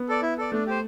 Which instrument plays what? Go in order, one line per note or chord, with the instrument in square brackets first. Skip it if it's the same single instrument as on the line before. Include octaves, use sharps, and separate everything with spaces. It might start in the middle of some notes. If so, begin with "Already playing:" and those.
Already playing: [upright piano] B3
[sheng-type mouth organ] A4 D5
E4
A4 D5
[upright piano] A3 [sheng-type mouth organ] D4
[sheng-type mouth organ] G4 C5